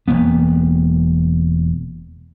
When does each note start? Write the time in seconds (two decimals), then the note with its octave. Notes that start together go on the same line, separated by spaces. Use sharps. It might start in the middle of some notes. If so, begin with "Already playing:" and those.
0.08 E1 A2 A#3 B3